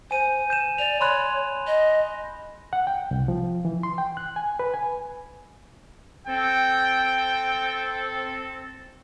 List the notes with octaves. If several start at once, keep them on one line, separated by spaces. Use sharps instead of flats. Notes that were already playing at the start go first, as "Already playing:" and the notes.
C5 G#5 D#7
G6 D#7 E7
D5 F7
C#5 B5 C6 F#6
D#5
F#5
G5
C2
F3
E3
C6
G5
F#6
G#5
B4
G#5
C4 A4 G5